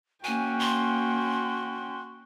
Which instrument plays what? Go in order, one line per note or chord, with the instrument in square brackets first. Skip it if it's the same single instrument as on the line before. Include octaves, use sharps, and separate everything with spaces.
[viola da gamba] A#3 [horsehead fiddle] C#4 G5 [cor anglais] F#4 [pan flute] G#5
[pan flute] C6